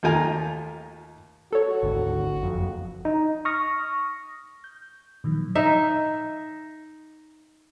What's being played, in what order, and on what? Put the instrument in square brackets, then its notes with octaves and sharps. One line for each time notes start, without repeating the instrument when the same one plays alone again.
[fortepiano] D#2 A3 F4 G5 G#5 A#5
[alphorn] F#4 [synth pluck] A4 C#5
[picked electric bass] G#1 D2
F#1 F2
[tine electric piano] D#4
[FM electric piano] C#6 D#6 F6 A#6
G6
A#2 D#3 F3 F#3
[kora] D#4 E5